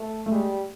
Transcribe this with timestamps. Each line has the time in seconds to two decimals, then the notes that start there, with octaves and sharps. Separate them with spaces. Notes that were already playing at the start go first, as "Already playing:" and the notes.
Already playing: A3
0.26 A3
0.31 G3 G#3